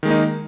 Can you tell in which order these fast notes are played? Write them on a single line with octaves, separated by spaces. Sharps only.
D#3 G#3 A#3 D#4